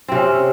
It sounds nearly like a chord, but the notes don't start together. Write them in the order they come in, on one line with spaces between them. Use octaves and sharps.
C4 C3 C#4